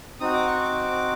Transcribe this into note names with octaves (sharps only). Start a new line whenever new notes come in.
C4 D#4 F#4 D#6
D6
C#6
D6